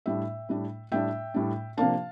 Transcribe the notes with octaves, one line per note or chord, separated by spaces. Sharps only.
A2 G3 D4 E5 G5
A2 G3 D4
A2 G3 D4 E5 G5
A2 G3 D4
C3 F3 A#3 D4 F5 A5